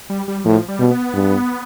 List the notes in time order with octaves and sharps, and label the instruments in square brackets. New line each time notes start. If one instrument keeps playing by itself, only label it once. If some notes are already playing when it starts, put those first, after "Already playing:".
[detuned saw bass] G3
G3
[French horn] A2 [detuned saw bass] F3
[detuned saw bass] G3
[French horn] B2
[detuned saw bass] B3
[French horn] G2